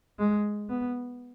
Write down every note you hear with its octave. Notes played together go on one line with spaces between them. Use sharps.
G#3
B3